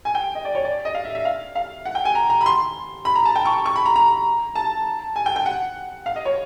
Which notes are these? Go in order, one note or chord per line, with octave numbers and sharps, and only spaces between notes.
G#5
G5
D#5
D5
C#5
D5
D#5
F5
E5
E5
F5
F5
F#5
G5
G#5
A#5
A#5
B5
C6
B5
A#5
A5
G5
C#6
C#6
B5
A#5
A#5
A5
G#5
G5
G5
F#5
F5
D#5
C#5